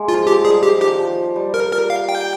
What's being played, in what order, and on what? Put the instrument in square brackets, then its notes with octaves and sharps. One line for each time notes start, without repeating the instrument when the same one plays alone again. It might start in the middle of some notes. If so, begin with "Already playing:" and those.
Already playing: [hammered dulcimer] G#3 A#3
[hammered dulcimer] F3 [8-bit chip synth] F4
[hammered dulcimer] F3 [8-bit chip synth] G4
[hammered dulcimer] G3 [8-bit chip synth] G#4
[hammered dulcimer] F3 [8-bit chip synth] G4
[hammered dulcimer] D#3 [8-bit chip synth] G4
[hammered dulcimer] F3
G3
[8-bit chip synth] A#4
A#4
F5
G5